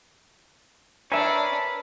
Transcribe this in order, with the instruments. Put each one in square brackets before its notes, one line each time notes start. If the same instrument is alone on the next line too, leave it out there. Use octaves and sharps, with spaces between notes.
[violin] D4 [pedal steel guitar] A#4 B4 C#5 [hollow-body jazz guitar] E5 G#5